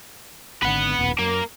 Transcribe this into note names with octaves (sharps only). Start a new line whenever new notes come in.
G#1 D3 B4 F#5
D#1 B1
F#2 A#3